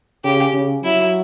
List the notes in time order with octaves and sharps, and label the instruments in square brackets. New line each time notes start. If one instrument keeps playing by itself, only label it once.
[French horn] C#3 [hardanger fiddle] G4
[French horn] C#3
[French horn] F#3 [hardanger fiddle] E4